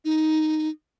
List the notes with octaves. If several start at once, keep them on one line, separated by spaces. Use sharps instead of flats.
D#4